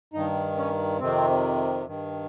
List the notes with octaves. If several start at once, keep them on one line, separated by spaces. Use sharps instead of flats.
G2 D#3 D#4
C#4
F2 C3 D#3 C4
G2 D#3